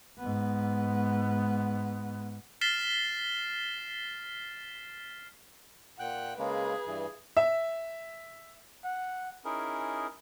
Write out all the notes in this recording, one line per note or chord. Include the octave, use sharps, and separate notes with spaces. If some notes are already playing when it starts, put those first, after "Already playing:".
G#2 B3
F6 A6 B6 C7 E7 G7
A#2 F#5 G5 F#6
C#3 G#3 A#3 G#4 B4
G2 E3
E5
F#5
C#4 D#4 E4 G#4 A#4